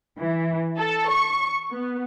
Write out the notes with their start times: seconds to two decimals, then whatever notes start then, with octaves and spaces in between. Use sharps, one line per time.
0.20 E3
0.77 A4
1.09 C#6
1.71 B3